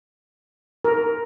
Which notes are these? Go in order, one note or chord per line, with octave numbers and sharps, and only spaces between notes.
A#4